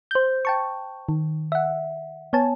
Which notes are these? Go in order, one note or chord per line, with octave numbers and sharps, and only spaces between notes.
C5 G6
G5 A5 C#6
D#3
E5 F#5
B3 C#5 G#5 A5